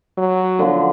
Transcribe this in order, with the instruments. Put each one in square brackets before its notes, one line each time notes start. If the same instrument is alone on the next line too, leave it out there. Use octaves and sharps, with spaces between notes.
[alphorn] F#3
[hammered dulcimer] D3 F3 B3